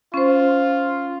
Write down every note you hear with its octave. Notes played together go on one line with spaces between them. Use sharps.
C#4 F4 C5